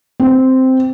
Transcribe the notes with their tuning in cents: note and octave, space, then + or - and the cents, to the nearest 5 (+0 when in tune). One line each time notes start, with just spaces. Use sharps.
C4 -5